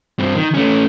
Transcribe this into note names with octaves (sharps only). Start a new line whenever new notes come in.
G2 C4
D#3
A3 C#4